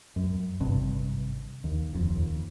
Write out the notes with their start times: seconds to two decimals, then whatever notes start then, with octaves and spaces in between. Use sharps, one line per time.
0.16 F#2
0.60 G#1 G2 C3
1.64 D#2
1.93 D#1 F2
2.09 D#2